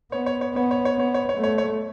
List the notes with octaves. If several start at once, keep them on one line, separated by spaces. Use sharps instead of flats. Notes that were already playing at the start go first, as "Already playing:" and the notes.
B3 C#5
C#5
C#5
B3 C#5
C#5
C#5
B3 C#5
C#5
C#5
A3
C#5
C#5